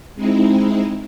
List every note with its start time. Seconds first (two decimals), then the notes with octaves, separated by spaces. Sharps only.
0.15 G#3 C4 D#4 E4